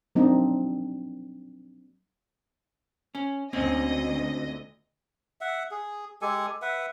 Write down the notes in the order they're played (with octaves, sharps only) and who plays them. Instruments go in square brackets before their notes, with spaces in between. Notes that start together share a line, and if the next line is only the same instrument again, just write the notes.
[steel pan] F#3 A#3 C4 D4 D#4
[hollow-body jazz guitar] C#4
[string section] D2 D#5 [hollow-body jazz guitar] A#2 C4 C#4
[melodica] E5 F#5
G#4
G#3 G4 A4 G#5
B4 E5 F#5